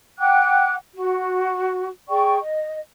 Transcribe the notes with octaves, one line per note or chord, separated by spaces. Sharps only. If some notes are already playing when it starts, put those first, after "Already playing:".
F#5 G5 D6 F#6
F#4
G#4 D5 G5 C#6
D#5